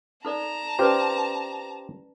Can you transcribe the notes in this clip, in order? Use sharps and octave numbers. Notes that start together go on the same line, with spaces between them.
D#4 A4 D5 A5 A#5
C#4 F4 G4 B4 C5 D5